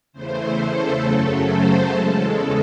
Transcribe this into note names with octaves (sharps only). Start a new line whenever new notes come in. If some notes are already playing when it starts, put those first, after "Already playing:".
E2 C#3 E3 A3 C5
A4
F#2 C#3 F#3 A3 A4
C5
E2 C#3 G#3 A4